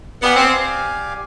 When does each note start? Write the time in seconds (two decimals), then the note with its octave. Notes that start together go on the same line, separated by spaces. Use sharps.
0.22 B3 G4 D5 F5 G#5
0.36 C4